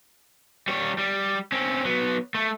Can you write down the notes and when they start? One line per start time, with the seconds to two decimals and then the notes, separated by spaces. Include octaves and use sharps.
0.68 G3 C#5
0.98 G3
1.52 C4 C#4
1.85 F#3 B3
2.35 A3